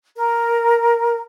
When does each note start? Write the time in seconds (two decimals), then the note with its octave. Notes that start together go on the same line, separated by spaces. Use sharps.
0.16 A#4